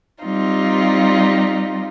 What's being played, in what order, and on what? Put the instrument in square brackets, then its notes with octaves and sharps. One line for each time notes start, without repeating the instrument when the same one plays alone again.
[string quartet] G3 C4 D#4 F4